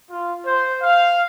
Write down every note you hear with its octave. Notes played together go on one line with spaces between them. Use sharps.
F4
C5
F5